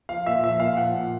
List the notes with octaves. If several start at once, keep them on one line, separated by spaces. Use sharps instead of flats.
F3 F5
A#2 E5
F3 E5
A#2 F5
F3 F#5
A#2